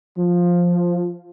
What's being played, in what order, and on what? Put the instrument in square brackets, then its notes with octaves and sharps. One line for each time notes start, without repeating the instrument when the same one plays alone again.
[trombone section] F3